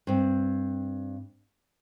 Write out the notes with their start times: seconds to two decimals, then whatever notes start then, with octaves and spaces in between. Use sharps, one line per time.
0.07 G2 C4